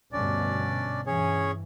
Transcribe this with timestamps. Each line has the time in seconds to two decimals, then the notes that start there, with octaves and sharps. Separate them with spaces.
0.13 D2 G2 B2 C#4 D4 D5
1.07 G2 E3 C#4 G#4 C#5